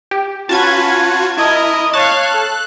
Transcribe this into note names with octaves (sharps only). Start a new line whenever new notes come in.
G4
C#4 F4 F#4 B4 A5 G#6
E4 A#4 D#5
C#5 F5 A5 F#6
A4